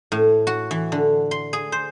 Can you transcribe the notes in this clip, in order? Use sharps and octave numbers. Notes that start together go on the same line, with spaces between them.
A2
F#4
E3
D3
C6
G#4
C5